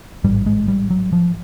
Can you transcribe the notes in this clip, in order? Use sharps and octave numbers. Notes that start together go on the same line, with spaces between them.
A1 G#2 G3
G#3
G3
F#3
F3